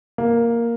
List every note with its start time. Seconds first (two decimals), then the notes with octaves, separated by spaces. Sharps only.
0.18 A#3